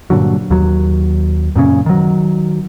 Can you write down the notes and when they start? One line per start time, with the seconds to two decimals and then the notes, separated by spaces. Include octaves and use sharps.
0.10 G2 A#2 D3 F#3
0.51 D#2 F#3
1.56 F#2 A#2 C#3 C#4
1.86 D#3 F#3